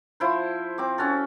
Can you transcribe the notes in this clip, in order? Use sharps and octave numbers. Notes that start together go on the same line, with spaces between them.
F3 E4 C5
C4 D6
C#4 F#4 A4